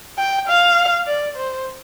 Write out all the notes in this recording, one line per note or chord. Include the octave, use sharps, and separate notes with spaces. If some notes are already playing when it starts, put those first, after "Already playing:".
G5
F5
D5
C5